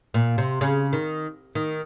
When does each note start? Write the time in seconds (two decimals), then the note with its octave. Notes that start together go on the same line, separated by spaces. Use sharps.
0.14 A#2
0.38 C3
0.61 C#3
0.93 D#3
1.55 D#3